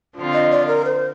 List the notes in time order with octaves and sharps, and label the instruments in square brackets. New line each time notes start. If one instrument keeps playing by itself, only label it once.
[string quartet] D3 F3 C4 F4
[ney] D#5
D5
A#4
C5